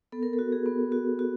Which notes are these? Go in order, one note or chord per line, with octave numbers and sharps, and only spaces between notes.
B3 A4
A#4
A4
F#4
G#4
B3
F#4
F#4